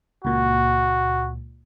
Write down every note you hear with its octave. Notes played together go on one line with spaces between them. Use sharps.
C#2 A#2 F#4